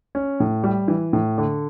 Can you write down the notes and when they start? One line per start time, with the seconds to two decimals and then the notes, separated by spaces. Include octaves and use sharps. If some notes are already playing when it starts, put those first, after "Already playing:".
0.15 C#4
0.40 A2
0.64 G3
0.88 E3
1.13 A2
1.38 D3